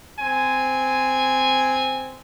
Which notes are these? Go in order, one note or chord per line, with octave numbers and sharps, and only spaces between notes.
C4 G#5